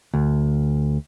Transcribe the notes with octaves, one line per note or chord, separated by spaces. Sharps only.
D2